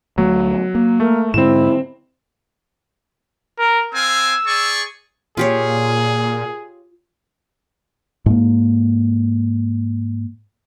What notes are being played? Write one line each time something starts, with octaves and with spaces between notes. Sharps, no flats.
D2 F#3 A3 B3
A#3
A3 A#4
G#2 D3 G#3 C4 E4 E7
A#4
C4 F5 G#5 E6
G#4 D5 C#6
A#2 F4 G4 G#4 C#5
G#2 A#3